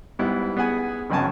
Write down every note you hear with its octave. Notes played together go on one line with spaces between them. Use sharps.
G#2 G3 B3 E4
B3 G#4 F#5 G#5
G#1 C#2 F#2 C#3 G#5 A5